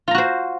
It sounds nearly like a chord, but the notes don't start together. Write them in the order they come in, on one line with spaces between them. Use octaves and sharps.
F4 A#5 F#4 C5